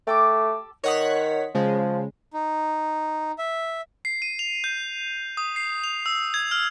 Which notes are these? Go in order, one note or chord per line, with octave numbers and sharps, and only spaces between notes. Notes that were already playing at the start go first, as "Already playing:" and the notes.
A3 G4 A4 D6
D#3 C#5 D#5 F#5 C6 D#6 B6
C#3 F3 G#3
D#4
E5
C7
D#7
F7
G6
D#6
C7
F7
E6
G#6
F6